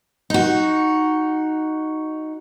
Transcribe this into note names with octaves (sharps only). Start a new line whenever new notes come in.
D#4 F#4